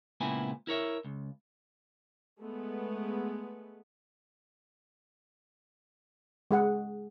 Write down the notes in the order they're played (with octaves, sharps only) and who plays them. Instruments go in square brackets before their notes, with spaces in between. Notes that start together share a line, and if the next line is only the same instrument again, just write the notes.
[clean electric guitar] C#2 A#2 B3 C4 E4 G#5
E4 A#4 C#5 E5
C#2
[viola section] G#3 A3 B3
[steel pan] G#3 G#4 F#5